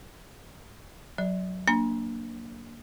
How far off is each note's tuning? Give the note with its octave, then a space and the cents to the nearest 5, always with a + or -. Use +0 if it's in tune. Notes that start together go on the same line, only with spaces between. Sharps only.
F#3 +0 D5 +0
A#3 +0 D4 +0 A#5 +25